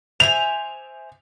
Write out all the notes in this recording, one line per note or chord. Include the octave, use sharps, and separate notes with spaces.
C5 E5 G#5 F7